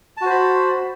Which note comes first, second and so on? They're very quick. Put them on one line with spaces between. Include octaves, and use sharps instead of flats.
A5 F#4 C5 B5